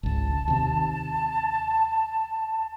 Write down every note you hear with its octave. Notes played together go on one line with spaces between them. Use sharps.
G#1 C#2 A5
D#2 C3